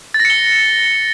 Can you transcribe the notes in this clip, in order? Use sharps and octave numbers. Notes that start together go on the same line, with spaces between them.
A6
A#6
C#7
G7